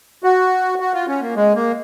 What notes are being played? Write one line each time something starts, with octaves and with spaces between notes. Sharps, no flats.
F#4
F#4
F4
C#4
A#3
G#3
A#3